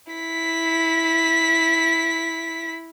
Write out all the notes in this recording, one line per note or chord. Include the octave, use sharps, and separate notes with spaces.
E4 B6